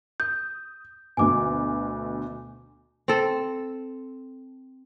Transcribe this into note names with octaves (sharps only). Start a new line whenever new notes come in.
D#6 G6
D2 B2 G#5 D6
C4 A4